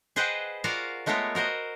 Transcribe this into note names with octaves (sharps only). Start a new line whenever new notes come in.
G#4 B4 C5 D#5 F#5 G5
F4 F#4 A#4 D5 F5 F#5
G#3 A3 B3 F4 A#4 C#5
F#4 A#4 C5 D#5